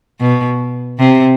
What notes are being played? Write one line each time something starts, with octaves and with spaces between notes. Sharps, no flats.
B2
C3